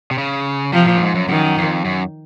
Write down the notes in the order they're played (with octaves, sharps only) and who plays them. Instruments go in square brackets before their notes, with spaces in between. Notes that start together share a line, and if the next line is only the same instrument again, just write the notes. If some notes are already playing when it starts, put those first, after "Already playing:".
[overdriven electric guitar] C3
C#3
[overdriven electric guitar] C3 [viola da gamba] F3
[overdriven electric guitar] A#2
F#2
G#2
F#2
[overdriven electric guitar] F#2 [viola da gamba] D#3
[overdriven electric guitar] F2
F#2